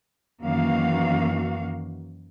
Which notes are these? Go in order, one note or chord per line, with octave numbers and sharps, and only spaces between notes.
F#2 D#3 E3 A#3 F#4 F5